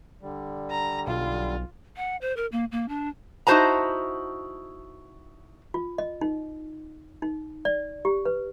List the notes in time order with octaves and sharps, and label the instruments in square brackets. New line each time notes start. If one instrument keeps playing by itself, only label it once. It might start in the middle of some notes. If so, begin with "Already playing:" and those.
[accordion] D3 G3
[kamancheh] A#5
[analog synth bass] B1 [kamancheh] F4
[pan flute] F#5
C5
A#4
A#3
A#3
D4
[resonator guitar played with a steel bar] D#4 E4 F#4 C5 A5 A#5
[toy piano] F4
D#5
D#4
D#4
D5
G4
B4